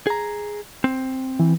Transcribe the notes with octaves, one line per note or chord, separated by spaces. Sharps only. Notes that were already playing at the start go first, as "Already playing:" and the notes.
G#4 A#5
C4
E3